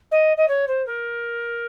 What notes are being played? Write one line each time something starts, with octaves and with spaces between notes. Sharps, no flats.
D#5
D#5
C#5
C5
A#4